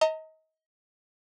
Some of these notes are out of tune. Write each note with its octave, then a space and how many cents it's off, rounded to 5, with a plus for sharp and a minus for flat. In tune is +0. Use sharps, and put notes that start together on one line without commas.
D#5 +30 A#5 -35